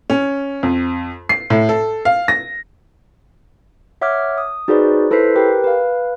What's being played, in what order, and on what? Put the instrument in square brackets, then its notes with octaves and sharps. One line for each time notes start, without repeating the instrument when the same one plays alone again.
[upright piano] C#4
F2
C7
A2
A4
F5
A#6
[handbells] C#5 E5 F#5 D6 F6 G#6
D#6
D#4 F#4 G#4 B4 C5 D5
E4 A4 B4 C5 B6 C7
G4 A#4 B4 G5
B4 F5